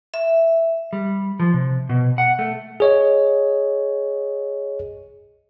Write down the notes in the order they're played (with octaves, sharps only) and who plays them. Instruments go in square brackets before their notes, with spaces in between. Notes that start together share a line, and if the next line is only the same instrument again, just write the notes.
[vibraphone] E5
[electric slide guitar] G3
F3
C3
B2
F#5
A3
[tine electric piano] G#4 C#5 D#5